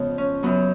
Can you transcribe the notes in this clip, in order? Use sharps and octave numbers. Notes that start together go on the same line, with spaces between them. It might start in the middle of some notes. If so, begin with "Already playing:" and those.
Already playing: F2 C#3 G#3 B3
C#4
F#2 C#3 F#3 B3